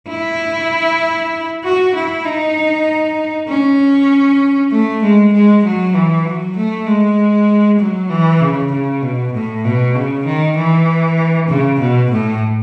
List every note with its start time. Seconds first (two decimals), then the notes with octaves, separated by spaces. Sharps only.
0.09 E4
1.63 F#4
1.94 E4
2.25 D#4
3.48 C#4
4.71 A3
5.03 G#3
5.32 G#3
5.64 F#3
5.95 E3
6.25 F#3
6.56 A3
6.87 G#3
7.79 F#3
8.10 E3
8.41 C#3
8.72 C#3
9.02 B2
9.33 A2
9.64 B2
9.95 C#3
10.26 D#3
10.56 E3
11.48 C#3
11.79 B2
12.11 A2